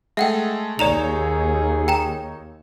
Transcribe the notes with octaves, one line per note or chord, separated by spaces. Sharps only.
G#3 A3 E5 F#5 G5
D#2 D#4 G#4 C#5 D5 A#5 F7
G5 A#5 E7